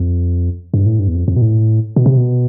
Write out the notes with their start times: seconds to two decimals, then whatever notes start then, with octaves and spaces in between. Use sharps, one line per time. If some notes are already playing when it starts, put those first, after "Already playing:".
Already playing: F2
0.74 G2
0.86 A2
0.99 G2
1.08 E2
1.15 F2
1.28 F2
1.36 B2
1.42 A2
1.96 B2
2.06 C3
2.17 B2